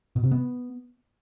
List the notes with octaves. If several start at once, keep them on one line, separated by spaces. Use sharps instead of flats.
B2
C3
B3